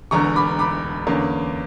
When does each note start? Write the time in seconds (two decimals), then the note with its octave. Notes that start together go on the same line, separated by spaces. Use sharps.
0.11 E1 E2 D3 A#5 C#6
0.36 B5 D6
0.59 B5 D6
1.07 E2 D3 A#3 C#4